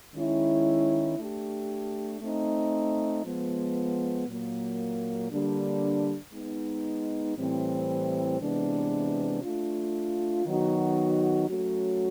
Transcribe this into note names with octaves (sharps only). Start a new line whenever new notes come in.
D#3 G#3 C#4 E4
A3 D4 G4
A3 C4 D#4
F3 G#3 B3
A#2 F#3 A#3
D3 G3 A#3 D4
G#3 B3 D#4
A2 E3 G3 C4
C3 E3 G#3 B3 D4
A3 D4 F4
D#3 F#3 B3 D#4 F#4
F#3 A3 C#4 F#4